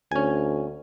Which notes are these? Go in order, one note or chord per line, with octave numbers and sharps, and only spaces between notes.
D2 C#4 G#5